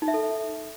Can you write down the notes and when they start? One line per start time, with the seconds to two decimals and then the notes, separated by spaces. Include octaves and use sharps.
0.02 D#4
0.08 E5
0.14 A4